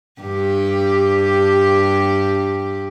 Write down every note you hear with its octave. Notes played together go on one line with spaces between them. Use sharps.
G2 G4